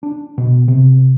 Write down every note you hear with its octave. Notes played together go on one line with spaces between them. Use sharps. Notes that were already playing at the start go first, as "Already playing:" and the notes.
D4
B2
C3